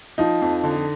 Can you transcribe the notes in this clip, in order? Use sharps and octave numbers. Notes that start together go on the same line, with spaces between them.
F3 D#4
F2
D3